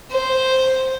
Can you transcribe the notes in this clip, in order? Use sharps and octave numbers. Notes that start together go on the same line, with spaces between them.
C5